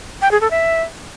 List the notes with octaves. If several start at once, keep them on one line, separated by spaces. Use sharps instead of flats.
G5
G#4
A4
E5